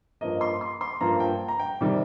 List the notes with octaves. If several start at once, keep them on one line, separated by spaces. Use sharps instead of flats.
G2 F3 A#3 D#5
C6
C6
C6
G2 F3 A#3 A#5
G5
A#5
G5
C3 D#3 G3